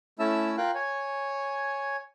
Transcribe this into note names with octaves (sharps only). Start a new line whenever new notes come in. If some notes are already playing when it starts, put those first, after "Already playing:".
A3 C#4 E4 E5 A5 E6
F4 A#4 F5 G5 F#6
C#5 G#5